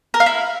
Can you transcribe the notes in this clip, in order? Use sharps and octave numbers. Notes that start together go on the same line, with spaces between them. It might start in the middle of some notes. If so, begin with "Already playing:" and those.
A#4
F5
E4